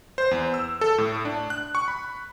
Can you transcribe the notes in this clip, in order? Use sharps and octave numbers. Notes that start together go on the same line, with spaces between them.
C5
E2
E6
A4
A2
D4
F#6
C#6
B5